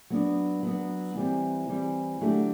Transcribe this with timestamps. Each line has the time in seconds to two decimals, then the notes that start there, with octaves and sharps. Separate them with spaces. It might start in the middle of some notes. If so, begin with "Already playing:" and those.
0.10 F#3 B3 D4
0.63 F#3 B3 D4
1.15 E3 G3 C4
1.69 E3 G3 C4
2.21 D3 F#3 A3 D4 G4